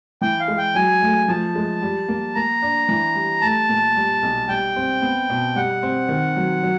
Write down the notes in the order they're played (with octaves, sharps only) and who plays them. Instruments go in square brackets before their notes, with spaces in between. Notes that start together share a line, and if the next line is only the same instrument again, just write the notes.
[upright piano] E3 [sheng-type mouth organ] G5
[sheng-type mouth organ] F5
[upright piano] G#3
[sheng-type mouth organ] G5
[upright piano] F#3 [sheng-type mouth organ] G#5
[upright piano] A3
[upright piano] F3 [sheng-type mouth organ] A5
[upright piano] G#3
G3
A#3
[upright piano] A#3 [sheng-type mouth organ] A#5
[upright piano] D4
E3
G3
[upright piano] A3 [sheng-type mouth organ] A5
[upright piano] A#2
G3
B1
[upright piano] G3 [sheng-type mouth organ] G5
[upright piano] C4
B3
B2
[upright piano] G3 [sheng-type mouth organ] F#5
[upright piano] C4
D#3
F#3
F#3